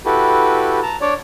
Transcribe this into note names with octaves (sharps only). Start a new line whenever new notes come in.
E4 F#4 G4 A4 B4
A5 A#5
D4 C#5 D5